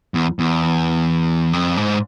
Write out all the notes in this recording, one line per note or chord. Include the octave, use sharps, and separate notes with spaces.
E2
E2
F2
G#2